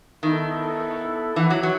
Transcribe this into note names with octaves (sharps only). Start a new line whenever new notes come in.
D#3 B3 E4 A4
E3 E4 B4 F#5
F#3
F#3